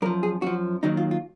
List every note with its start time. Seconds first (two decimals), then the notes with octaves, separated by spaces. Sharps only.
0.02 F#2 A#4
0.06 F3
0.23 G#4
0.42 F#2 F3 F#4
0.83 D#2 D#3 F#3 D#4
0.97 F4
1.11 F4